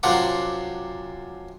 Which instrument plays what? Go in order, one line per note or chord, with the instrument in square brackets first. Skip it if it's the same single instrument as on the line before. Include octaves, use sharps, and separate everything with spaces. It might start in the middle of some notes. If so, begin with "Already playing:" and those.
[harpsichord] F#2 C3 F3 D4 F#5 D6